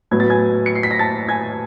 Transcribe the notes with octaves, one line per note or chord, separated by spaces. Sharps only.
A2 F#3 B3 G#6
A6
G#5 G#6
C#7
C7
B6
A#6
A5 A6
G#5 G#6